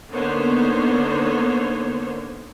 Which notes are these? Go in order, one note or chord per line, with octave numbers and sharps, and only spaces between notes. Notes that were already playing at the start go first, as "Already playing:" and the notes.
D3 A#3 B3 D#4 C5 C#5